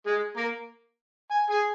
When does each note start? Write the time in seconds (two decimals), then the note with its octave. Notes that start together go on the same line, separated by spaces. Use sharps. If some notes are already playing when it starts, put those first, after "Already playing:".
0.06 G#3 G#4
0.37 A#3 A#4
1.31 G#5
1.50 G#4 G#5